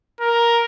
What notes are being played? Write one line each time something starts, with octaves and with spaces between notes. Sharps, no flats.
A#4